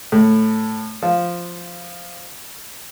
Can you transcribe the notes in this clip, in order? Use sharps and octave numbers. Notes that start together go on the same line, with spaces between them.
A2
F3